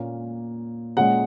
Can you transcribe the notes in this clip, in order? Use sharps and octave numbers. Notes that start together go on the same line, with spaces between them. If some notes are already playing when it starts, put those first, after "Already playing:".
Already playing: A#2 A#3 C#4
A#2 G#3 C#4 F#5